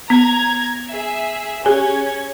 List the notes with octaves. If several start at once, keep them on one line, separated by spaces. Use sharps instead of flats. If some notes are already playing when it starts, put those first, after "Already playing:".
B3 A#5 G#6
G#4 E5
C#4 G4 G#4 G#5 G#6